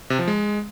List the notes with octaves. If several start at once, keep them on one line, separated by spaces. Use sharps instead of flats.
C3
F3
G#3